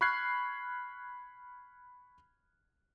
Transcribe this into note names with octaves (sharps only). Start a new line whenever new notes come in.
B5 C#6 F6 F#6 G#6 C7